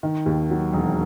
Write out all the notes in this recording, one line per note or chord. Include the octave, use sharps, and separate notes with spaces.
D#3
D#2
F#3
E1